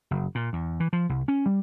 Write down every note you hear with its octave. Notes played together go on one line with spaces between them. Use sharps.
F#1
A#2
E2
E3
F3
C2
C#4
G3